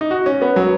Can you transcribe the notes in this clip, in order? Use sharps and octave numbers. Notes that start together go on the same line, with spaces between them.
D#4
F#4
C#4
B3
F#3